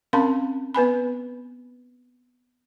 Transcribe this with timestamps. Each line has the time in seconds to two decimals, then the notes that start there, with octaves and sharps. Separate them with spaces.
0.13 C4 C#4 A#4 F5 B5 C6
0.75 B3 B4 G#5 B5